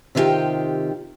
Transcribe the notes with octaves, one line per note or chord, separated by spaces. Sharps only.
C3 D#3 E4 F4 G4 G5